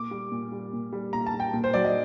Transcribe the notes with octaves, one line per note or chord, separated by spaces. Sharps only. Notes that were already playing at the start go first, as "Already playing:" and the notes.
Already playing: A#2 D6
G3
A#2
G3
A#2
G3
A#2 A#5
A5
G3
G5
A#2
C5
F#3 D5
D#5